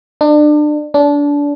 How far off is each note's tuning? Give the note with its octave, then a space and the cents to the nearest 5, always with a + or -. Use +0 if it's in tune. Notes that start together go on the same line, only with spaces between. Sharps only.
D4 +30
D4 -25